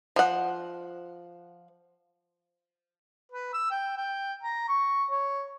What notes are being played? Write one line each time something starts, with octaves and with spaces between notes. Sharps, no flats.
F3 F#5
B4
E6
G5
G5
A#5
C#6
C#5